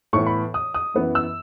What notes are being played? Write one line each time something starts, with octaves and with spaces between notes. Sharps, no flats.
A2 E3 B3 C#6
B5
D#6
D#6
F#2 E3 B3
E6